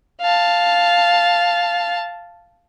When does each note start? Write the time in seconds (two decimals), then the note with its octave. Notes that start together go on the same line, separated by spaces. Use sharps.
0.22 F5 A5